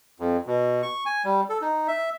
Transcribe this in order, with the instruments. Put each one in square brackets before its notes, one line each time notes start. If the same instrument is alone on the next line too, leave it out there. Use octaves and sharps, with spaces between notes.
[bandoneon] F2
B2
C#6
G#5
G3
A4
D#4
E5